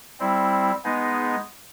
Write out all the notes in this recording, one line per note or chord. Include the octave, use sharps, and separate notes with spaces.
G3 C4 E4
G#3 B3 D#4 G#4